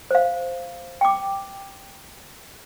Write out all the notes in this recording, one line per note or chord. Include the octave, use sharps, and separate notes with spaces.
C5 F5
G5 D6